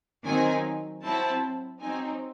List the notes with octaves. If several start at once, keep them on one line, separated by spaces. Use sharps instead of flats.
D#3 F#3 C4 D#4 G#5
F#3 C4 E4 A5
F#3 C4 D#4 G#5